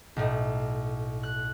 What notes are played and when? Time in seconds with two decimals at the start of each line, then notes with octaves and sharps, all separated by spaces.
0.16 B1 A2
1.23 F#6